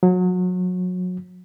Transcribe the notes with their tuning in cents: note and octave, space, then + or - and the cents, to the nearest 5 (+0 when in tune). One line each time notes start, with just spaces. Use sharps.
F#3 -30